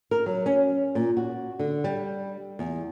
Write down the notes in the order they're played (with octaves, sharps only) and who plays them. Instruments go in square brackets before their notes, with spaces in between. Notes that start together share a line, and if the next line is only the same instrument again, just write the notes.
[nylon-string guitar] A#4
F#3
C#4
A#2
F#4
D3
G3
E2